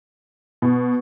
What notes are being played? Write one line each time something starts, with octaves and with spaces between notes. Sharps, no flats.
B2